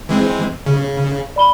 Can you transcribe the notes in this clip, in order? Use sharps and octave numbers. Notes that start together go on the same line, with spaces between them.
E3 G#3 C4
C#3
D5 B5 G7